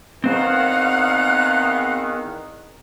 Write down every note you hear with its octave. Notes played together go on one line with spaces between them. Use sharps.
E2 D#3 C4 C5 F5 F#5 F#6